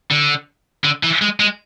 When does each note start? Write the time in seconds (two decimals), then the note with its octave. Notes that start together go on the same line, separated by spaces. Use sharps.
0.11 D3
0.84 D3
1.03 E3
1.22 G#3
1.40 G#3